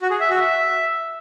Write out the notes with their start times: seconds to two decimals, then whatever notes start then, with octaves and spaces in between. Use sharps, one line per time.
0.01 F#4
0.10 G#4
0.20 E5
0.30 F#4
0.40 E5